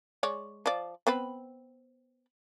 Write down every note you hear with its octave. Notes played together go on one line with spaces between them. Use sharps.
G#3 C#5 D5
F3 D5
B3 C4 B4